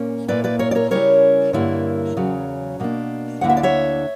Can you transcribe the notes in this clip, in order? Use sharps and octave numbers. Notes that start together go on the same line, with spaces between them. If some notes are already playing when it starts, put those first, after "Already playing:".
Already playing: A#2 A#3 C#4
A#2 A#3 E4 B4 D5
B4 D5
A#4 C#5
D5
A#4 C#5
C#3 G3 C#4 E4 A#4 C#5
G2 D3 A#3 E4
E2 C#3 F#3
B2 A#3 D4
D2 D3 A#3 E4 F#5
E5
D5
C#5 E5